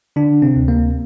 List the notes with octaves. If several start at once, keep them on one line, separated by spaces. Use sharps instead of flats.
D3 D4
C3 C4
D2
A#3